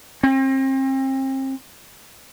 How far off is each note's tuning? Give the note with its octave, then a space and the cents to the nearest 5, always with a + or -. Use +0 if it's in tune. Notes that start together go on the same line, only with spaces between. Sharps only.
C4 +35